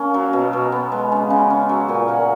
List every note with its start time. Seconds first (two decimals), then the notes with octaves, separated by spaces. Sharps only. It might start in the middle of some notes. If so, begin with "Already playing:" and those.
Already playing: A#3 C#4 F5
0.14 F#3
0.33 B2
0.53 B2
0.72 B3
0.92 G#3
1.12 C#3
1.30 C#3
1.50 C#4
1.69 F#3 G#5
1.88 A#2 G#5
2.08 A#2 F#5